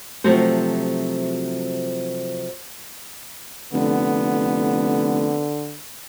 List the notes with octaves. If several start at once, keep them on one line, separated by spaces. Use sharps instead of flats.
C3 F3 F#3 A3 F#4 C5
F1 D3 B3